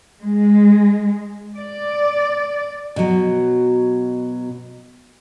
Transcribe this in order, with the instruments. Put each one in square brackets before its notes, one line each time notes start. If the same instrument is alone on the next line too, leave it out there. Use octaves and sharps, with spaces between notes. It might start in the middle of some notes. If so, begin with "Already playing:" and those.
[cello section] G#3
D5
[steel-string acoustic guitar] B2 F#3